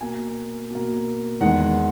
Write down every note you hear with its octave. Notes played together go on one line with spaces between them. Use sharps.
B2 A#3 G#5
B2 A#3
E2 D#3 G#3 B3 F#5